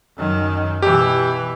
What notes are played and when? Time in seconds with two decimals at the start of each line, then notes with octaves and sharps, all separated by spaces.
0.16 F#2 D#3
0.82 B2 E3 G4